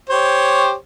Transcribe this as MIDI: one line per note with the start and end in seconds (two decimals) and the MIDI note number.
0.09 0.74 67
0.09 0.74 72
0.09 0.74 73